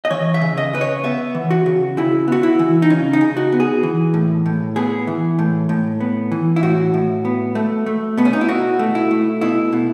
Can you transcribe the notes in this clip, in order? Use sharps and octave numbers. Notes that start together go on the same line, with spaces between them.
D#5
E3 C#5
E5
C#3
D#5
C#3 B4
C#5
B3 E5
E3
F#4
C#3
C#3 E4
B3 F#4
E4
E3
D#4
C#3 C#4
D#4
C#3
F#4
B3
G#4
E3
A2
A2
B3 G#4
E3
A2
A2
B3
E3
E4
A2 F#4
A2
B3
A3
A3
B2 B3
C#4
D#4
E4
B2 F#4
A3
E4
A3
B2 E4
B2